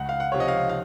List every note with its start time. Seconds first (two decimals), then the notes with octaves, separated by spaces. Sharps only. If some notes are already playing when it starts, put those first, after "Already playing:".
Already playing: C#2 F#5
0.09 F5
0.20 F#5
0.32 C3 F3 C4 C#5
0.40 D#5
0.48 F5
0.69 F5